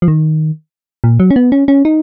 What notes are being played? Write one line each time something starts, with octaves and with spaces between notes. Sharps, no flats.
F3
D#3
A#2
F#3
C#4
B3
C#4
C#4
D#4